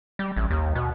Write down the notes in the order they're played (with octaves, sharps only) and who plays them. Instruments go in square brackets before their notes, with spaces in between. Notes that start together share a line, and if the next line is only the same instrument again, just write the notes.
[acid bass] G3
A1
D#2
B2